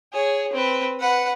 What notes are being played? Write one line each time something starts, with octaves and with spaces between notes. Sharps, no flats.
G#4 C#5
C4 B4
B4 F#5